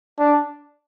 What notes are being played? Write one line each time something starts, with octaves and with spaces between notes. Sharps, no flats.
D4